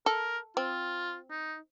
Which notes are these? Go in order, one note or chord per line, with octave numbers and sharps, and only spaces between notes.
A4 A#4
C4 F4
D#4